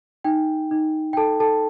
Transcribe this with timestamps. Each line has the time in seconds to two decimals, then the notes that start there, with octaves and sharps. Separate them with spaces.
0.24 D#4 G5
0.71 D#4
1.13 G5
1.17 A4 A5
1.40 A4 A5